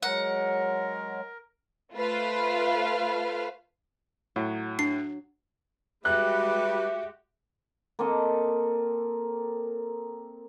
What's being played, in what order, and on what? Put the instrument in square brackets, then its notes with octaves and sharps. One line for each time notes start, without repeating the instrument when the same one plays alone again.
[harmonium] F#3 G#3 [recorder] A#4 [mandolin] F#5
[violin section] A3 F4 B4 C5 F5
[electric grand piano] A2 [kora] F#3
[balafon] D4 [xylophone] C7
[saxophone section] G3 B4 [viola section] G#3 F#4 G4 [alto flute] E5 [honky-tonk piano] F#6
[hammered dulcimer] A#3 C4 A4 D#5